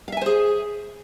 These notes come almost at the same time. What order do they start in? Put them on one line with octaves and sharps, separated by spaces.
F5 E5 G#5 C5 G#4